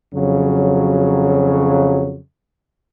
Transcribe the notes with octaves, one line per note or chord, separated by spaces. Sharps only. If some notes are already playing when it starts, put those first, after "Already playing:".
F2 C#3 F#3